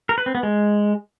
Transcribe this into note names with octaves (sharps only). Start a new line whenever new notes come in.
A#4
B4
C4
B3
G#3